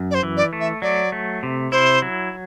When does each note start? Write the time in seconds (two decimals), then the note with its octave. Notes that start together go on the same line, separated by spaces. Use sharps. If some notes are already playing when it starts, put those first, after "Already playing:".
Already playing: F#2
0.11 D5
0.14 C5
0.23 E3
0.37 D5
0.53 A3
0.60 E5
0.82 F#3 D5
1.12 A3
1.43 C3
1.72 E4 C5
2.02 F#3